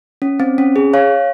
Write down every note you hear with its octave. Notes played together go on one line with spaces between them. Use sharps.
C#4
C4
C#4
G#4
C#5 F5